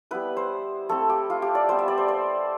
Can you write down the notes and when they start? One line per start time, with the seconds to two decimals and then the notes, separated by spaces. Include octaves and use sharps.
0.11 G3 B3 E4 B4
0.37 C5
0.89 A3 C4 E4 A4
1.09 G4
1.30 F4
1.42 G4
1.55 D5
1.69 G3 B3 E4 C5
1.79 E5
1.88 D5
1.98 C5
2.08 C5